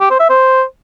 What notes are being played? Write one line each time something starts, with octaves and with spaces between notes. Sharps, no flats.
G4
C5
E5
C5